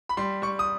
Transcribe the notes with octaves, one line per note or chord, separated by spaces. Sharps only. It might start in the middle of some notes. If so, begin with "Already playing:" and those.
B5
G3 C6
G3 C#6
D#6